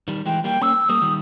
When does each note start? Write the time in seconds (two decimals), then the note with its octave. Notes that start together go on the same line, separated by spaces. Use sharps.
0.08 D#3 G3
0.26 E3 G#3 G5
0.44 G3 A#3 G5
0.61 A#3 C#4 E6
0.89 G3 A#3 D#6
1.02 D#3 G3